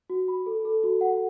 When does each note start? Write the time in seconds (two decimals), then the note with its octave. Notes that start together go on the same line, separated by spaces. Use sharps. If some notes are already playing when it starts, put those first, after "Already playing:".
0.10 F#4
0.28 B5
0.46 A4
0.65 A4
0.84 F#4
1.01 F#5